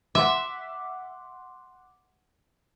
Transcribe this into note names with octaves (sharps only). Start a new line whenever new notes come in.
E5 F#5 C6 D6